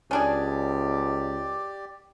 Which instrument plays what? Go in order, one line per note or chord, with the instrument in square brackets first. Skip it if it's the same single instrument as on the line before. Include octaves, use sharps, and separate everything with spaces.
[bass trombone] C#2 [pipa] C#4 D4 G#4 [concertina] G4 D5